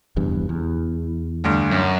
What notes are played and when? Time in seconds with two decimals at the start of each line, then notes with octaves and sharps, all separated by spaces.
0.16 F1 E2 G2
0.49 E2
1.44 D2 G2
1.71 F#2